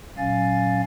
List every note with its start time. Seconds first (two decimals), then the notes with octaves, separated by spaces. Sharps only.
0.17 A#2 F#3 C#4 F5 G#5 A6